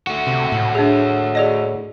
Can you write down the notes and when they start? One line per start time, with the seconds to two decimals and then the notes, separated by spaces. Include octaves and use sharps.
0.07 A3 F#4
0.27 C3
0.52 A2
0.75 D4 G#4
1.35 G#4 D5 D#5